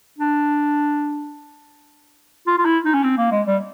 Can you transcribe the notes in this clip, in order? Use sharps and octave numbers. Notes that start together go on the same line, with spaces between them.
D4
F4
F4
E4
D#4
C#4
C4
A#3
G#3
G3